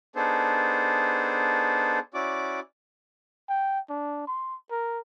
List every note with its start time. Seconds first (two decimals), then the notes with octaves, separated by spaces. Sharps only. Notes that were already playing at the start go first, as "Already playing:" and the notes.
0.16 B3 D4 D#4 G#4 A4 C5
2.14 C#4 E4 F#4 D5 D6
3.49 G5
3.89 D4
4.27 C6
4.71 A#4